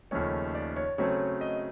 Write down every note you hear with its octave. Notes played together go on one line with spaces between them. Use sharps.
D#2 C#3 F3 A3 C#4 C#5
D5
C#5
C#3 F#3 A3 C4 C#5
D#5